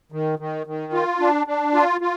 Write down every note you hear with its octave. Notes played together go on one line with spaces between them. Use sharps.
D#3
D#3
D#3
F4
D4
D4
F4
F4